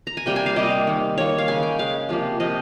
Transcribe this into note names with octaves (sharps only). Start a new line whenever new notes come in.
A#5
G#5
C3 G3 A#3 G5
G#5
F5
C3 G3 A#3 D#5
D#3 A#3
D#3 A#3 C#5
F5
C#3 G#3 G#5
G5
C#3 G#3 F5
C3 F3 A#3
C3 F3 A#3 D#5